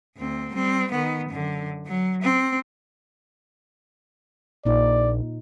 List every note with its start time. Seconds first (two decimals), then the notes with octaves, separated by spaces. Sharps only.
0.17 D2 C4
0.52 G3 C4
0.91 D#3 B3
1.29 F#2 D3
1.87 F#3
2.22 C4
4.65 A#1 A#2 D#4 D5